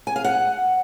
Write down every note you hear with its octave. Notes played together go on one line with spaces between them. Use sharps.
G#5
F5
F#5